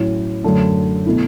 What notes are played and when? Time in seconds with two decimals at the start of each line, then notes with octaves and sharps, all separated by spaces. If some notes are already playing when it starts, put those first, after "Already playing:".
Already playing: A2 F#3 C#4 E4
0.44 F#2 D3 F#3 A3 D4
1.06 B2 A3 E4